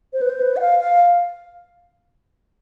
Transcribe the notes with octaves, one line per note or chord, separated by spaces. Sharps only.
C5
B4
C5
B4
F#5
F5
F5